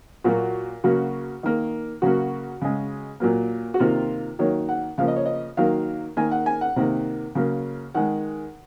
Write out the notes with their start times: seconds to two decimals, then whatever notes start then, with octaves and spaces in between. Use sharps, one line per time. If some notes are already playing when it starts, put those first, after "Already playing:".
0.24 A#2 F#3 A#3 F#4
0.84 C#3 F#3 A#3 F#4
1.43 D#3 A#3
2.02 C#3 F#3 A#3 F#4
2.61 C#3 G#3
3.20 A#2 F#3 A#3
3.74 F#4
3.80 C3 D#3 A#3 F4
4.39 D#3 F#3 A#3 C#5
4.69 F#5
4.98 C#3 F3 A#3 F5
5.08 D#5
5.16 C#5
5.26 D#5
5.57 D#3 F#3 A#3 F5
6.17 D#3 A#3 G#5
6.31 F#5
6.46 G#5
6.61 F#5
6.76 C3 D#3 A#3
7.35 C#3 F#3 A#3
7.95 D#3 G#3 F#5